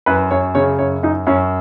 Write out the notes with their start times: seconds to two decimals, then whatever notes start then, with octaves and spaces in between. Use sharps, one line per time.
0.06 F#2 B4
0.31 F#2 C#5
0.55 C#3 C#5
0.79 F#2 C#5
1.03 F#2 D#4
1.27 F#2 C#4